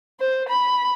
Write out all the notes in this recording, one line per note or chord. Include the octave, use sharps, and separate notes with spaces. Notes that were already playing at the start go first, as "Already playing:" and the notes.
C5
B5